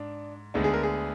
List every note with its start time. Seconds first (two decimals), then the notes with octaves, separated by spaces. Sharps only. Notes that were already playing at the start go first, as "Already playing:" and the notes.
Already playing: G#2 D4
0.54 D2 D3 G#3 B3 D4 D#4
0.64 G#4
0.73 A#4
0.83 G#4